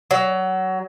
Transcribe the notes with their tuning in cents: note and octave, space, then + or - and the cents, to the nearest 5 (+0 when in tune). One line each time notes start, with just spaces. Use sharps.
F#3 +20